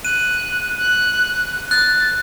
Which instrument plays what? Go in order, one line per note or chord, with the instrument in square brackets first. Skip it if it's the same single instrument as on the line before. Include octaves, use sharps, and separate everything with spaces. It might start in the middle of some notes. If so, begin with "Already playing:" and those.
[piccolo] F#6 [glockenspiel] D#7
[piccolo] F#6
[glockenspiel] F#6 [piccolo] A6